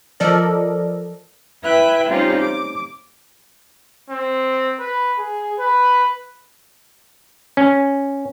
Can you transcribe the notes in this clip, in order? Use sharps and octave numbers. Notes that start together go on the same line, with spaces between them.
F3 A4 A#4 D5 D#5
E4 B4 E5 G5 F#6
G3 C4 C#4 D#4 F4
D6
C4
B4
G#4
B4
C#4